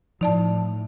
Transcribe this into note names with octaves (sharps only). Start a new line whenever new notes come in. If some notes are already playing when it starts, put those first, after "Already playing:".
A2 F3 D#4 D5 A5